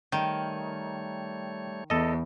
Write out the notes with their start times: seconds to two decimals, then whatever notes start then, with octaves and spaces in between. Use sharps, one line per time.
0.12 D#3 G3 A3 C#5 G5
1.90 E2 A4 D#5